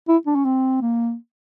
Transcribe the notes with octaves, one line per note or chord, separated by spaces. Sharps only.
E4
D4
C#4
C4
A#3